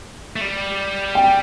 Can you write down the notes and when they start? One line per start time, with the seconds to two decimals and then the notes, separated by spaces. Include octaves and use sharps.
0.36 A3
0.41 G3
1.15 G5